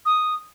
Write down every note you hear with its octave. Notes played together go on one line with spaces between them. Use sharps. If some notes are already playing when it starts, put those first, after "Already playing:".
D#6